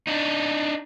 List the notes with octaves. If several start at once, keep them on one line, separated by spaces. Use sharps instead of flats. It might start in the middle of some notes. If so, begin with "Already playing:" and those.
D4 D#4